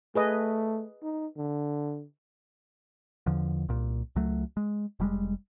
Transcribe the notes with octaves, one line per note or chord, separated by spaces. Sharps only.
A3 G#4 B4 D#5
D#4
D3
E2 D3 F3
C2 A#2
C#2 F#3 A3
G#3
F1 G3 G#3